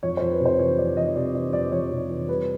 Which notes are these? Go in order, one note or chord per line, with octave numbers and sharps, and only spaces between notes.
F2 C#5
F2 C5
B4
C3 C5
E3 C#5
F2 D5
F2 D#5
C3 D5
E3 D5
F2 D5
F2 C#5
C3
E3
G3 B4